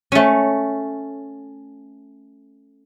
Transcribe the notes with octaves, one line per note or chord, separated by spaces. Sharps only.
A3 C#4